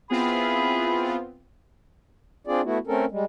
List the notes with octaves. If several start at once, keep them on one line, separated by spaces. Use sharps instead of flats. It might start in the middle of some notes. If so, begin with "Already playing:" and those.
B3 C4 E4 F4 G#4 B5
C4 D4 F4 G#4 D5
A3 B3 E4 F#4
A3 C4 C#4 A4 A#4
G3 G#3